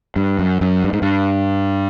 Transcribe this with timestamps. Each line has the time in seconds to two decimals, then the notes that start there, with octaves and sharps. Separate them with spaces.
0.16 G2
0.39 F#2
0.61 F#2
0.84 G2
0.93 G#2
1.02 G2